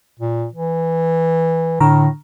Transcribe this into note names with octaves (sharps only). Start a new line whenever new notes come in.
A#2
E3
A2 D3 A#5